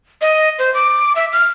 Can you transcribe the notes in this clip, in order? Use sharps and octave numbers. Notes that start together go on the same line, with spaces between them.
D#5
C5
D6
E5
F6